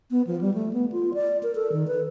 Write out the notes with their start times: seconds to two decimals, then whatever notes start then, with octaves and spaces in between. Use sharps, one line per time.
0.11 B3
0.27 F3
0.41 G3
0.54 A3
0.73 B3
0.92 F4
1.14 D5
1.43 A#4
1.55 A4
1.72 D#3
1.87 B4